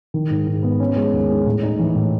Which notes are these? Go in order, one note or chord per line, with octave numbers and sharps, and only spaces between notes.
D#3
G#2
G#2
B3
C#4
G#3
D#2
G#3
A2
D#4
E3
A2